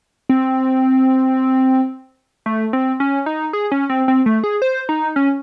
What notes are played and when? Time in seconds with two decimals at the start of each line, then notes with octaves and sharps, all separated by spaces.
0.29 C4
2.46 A3
2.73 C4
3.00 C#4
3.26 D#4
3.53 G#4
3.72 C#4
3.90 C4
4.08 C4
4.26 A3
4.44 G#4
4.62 C5
4.89 D#4
5.16 C#4